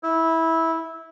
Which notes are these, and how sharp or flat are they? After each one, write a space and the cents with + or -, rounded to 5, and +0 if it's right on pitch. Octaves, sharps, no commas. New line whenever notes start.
E4 -15